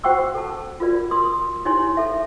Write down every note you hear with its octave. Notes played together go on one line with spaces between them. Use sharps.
F#4 C5 F#5 G5 C#6 E6
A4 A5
F4 F#4 A#4 D5
A#4 C6 D#6
D#4 E4 G4 C#5 G#5 C6
A4 E5